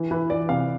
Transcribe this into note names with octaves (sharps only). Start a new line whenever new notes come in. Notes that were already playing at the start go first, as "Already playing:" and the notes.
Already playing: E3
E3 B4
E3 D5
C3 F5